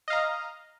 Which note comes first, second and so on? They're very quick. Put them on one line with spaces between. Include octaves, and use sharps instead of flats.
D#5 F5 A#5